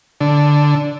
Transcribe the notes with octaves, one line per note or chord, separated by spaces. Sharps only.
D3